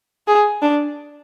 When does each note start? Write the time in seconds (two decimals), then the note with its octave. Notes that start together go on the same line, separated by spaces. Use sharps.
0.27 G#4
0.62 D4